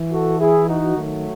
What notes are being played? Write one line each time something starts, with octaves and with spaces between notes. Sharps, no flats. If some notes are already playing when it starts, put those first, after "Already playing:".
Already playing: E3
F#4 A4
E4 G#4
D#4 F#4
D#3 F#3 A3